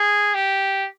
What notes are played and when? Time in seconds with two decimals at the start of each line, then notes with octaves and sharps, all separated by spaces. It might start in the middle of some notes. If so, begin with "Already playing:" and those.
Already playing: G#4
0.34 G4